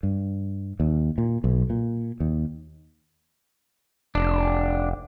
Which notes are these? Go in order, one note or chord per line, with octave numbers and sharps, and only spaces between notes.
G2
D#2
A#2
B1
A#2
D#2
F1 D4